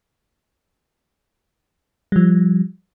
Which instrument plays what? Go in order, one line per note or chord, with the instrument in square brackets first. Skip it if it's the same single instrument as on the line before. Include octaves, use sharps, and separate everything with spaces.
[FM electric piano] F3 G3